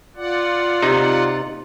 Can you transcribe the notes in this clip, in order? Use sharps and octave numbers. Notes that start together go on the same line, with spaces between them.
F4 D5 F#5
C3 D#4